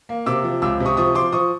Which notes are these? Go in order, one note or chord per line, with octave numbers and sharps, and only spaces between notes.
A#3
C3 D6 E6
F3
C#2 D6 E6
C3
C#6 D#6
F3 C#6 D#6
F3 C6 D6
F3 C#6 D#6